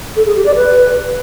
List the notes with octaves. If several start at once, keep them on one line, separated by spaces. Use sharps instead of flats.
A4
G#4
G4
D5
B4